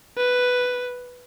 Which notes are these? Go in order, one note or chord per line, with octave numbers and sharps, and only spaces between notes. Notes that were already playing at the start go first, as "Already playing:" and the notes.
B4